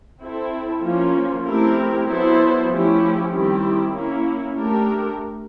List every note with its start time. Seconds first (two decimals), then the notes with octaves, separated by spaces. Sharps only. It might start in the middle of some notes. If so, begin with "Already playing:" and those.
0.20 C4 E4 A4
0.82 F3 A#3 C#4 F4
1.45 A3 C4 E4 G4 A#4
2.07 F#3 B3 E4 A4 C5
2.69 F3 A3 C#4 E4 G4
3.31 D#3 G3 C4 E4 G4
3.93 A#3 C#4 E4
4.56 A3 D4 G4 A#4